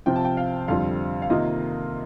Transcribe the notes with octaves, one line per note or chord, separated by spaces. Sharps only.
C3 F3 C4 F4 G5
A5
G5
F5
F2 D3 G3 C4 F4 F5
F5
C3 D#3 A#3 F4 D#5